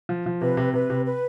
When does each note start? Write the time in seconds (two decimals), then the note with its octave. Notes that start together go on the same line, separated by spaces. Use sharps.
0.09 F3
0.26 F3
0.41 C3 B4
0.57 C3
0.74 C3 B4
0.90 C3
1.06 B4